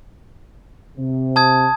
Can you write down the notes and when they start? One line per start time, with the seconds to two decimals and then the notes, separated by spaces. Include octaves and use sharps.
0.98 C3
1.36 A5 D#6 G#6